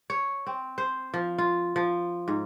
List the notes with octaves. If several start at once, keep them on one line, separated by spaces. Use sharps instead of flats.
C#5
C4
C5
F3
F4
F3
G#2